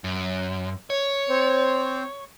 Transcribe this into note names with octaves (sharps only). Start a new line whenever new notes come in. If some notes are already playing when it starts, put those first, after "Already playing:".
F#2
C#5
C4 C5